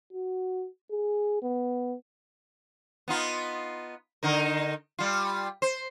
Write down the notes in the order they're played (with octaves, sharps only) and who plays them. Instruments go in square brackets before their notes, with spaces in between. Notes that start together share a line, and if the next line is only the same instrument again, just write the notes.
[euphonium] F#4
G#4
B3
[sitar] B3 D#4 F4
D3 D#4 A#4
G3 F4
C5